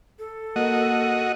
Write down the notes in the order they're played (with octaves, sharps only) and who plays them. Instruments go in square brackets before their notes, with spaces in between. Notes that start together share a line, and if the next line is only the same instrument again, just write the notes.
[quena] A4
[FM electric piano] A#3 A#4 [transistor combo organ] F#4 D#5